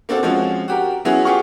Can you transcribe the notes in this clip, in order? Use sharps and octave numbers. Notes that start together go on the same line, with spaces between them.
A#3 C4 D4 F#4 A4
F3 G#3 C4 C#4 F#4
F#4 G4 A#4
F#3 B3 C#4 E4 F#4 G#4
F4 G4 G#4 F#5 C#6 F6